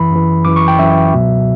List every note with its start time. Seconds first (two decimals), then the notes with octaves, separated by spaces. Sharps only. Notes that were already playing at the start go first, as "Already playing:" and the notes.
Already playing: F#2 E3 B5
0.11 F#2 E3
0.45 F#2 E3 D6
0.56 C#6
0.68 G5
0.79 F#2 E3 E5
1.13 C#2 B2 F#3